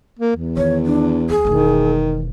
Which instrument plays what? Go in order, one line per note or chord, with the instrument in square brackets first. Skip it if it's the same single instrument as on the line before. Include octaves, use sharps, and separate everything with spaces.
[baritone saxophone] A#3
E2
[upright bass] D#3 [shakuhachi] C#5
[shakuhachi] D4
[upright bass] D2 [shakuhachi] G#4
[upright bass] E1 A3 [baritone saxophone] D#3